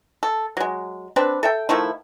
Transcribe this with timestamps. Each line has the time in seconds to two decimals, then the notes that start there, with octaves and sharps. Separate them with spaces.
0.23 A4
0.57 F#3 G#3
1.16 C4 D4 B4
1.43 A4 E5 G5
1.69 D#3 F3 A3 E4